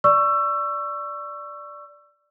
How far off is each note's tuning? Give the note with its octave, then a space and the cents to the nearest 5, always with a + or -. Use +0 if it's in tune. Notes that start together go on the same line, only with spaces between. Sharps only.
D5 +0 C#6 +0 E6 +25